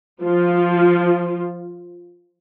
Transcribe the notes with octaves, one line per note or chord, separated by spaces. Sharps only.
F3 F4